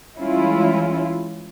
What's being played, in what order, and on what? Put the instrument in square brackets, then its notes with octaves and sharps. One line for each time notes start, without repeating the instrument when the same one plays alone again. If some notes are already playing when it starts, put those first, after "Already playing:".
[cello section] E3 G3 G#3 C#4 E4 F4